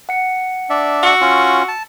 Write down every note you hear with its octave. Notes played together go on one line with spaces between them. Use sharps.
F#5 C#7
D4 D5 E5
F#4 E6 C#7
C#4 F4
A5